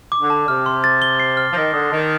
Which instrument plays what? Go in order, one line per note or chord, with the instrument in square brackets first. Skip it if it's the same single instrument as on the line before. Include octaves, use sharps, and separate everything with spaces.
[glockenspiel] D6
[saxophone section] D3
[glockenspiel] A5
[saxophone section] C3 [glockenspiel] F6
[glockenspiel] C6
A6
G7
C7
F6
[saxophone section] F3
[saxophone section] D#3 [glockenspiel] A#6
[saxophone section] D3 [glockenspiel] D#6
[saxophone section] D#3 [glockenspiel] A5